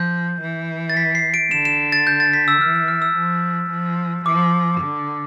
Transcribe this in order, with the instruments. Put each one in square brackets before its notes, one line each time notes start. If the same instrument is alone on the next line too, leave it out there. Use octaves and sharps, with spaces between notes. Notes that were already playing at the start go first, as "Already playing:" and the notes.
Already playing: [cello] F3 [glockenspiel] G6
[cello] E3
[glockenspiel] A6
B6
C7
D7
[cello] D3 [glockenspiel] E7
[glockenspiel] E7
A6
G6
A6
B6
E6
[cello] E3 [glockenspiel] F6
[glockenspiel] F6
F6
E6
[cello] F3
F3
[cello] F3 [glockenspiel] D6
[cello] D3